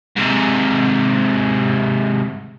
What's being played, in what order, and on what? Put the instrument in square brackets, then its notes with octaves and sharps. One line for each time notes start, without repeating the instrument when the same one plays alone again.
[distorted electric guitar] G#2 C3